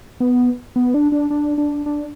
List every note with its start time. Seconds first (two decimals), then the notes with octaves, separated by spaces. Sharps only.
0.20 B3
0.76 B3
0.94 D4
1.12 D4
1.30 D4
1.58 D4
1.86 D4